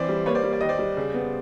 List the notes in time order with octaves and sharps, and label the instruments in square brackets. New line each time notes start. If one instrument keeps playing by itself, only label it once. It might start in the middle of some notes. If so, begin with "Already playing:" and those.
Already playing: [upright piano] E3 C4 C5 D5
G3
A#3 B4 C#5
C5 D5
G3
D5
D#2 D#5
C5 D5
G3
C#3
B3